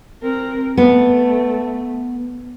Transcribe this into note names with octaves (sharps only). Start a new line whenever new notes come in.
C4 A#4
A3 B3